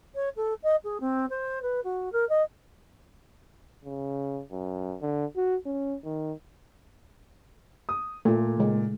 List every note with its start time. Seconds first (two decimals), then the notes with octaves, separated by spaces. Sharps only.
0.15 C#5
0.36 A4
0.63 D#5
0.84 G#4
1.00 C4
1.30 C5
1.62 B4
1.84 F#4
2.12 A#4
2.29 D#5
3.85 C#3
4.52 F#2
5.01 D3
5.36 F#4
5.66 C#4
6.04 D#3
7.89 D#6
8.25 A#2 A3 F4
8.57 C#3 G#3